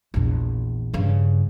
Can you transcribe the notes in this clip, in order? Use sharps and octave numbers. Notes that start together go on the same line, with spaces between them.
A#1 E2
G2 C#3